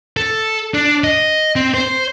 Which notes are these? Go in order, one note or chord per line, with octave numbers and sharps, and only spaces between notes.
A4
D4
D#5
C4
C5